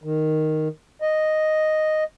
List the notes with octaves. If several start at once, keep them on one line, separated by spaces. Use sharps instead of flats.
D#3
D#5